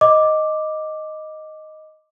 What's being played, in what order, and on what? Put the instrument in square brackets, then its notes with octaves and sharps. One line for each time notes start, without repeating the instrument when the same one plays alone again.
[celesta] D#5 D6